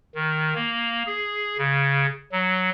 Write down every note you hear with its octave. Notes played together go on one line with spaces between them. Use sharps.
D#3
A#3
G#4
C#3
F#3